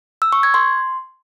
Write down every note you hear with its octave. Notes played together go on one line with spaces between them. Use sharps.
E6
C#6
G#6
C6